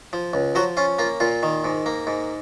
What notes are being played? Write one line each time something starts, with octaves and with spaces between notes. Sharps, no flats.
F3
C#2
F3 F#3 F#4
C#4 F4
A#3 F4
A#2 F4
D#3
G#2
A#3
G#2